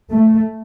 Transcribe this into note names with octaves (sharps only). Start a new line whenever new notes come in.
A3